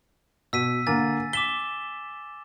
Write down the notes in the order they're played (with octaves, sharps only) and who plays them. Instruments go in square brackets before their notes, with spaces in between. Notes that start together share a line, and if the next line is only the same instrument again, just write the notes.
[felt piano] B2 [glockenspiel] E6 B6 D#7
[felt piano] D3 A#3 [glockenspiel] G#5 A6
[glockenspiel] D6 E7 G7 [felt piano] B6